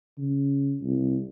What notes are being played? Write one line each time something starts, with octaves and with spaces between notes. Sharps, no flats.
C#3
C2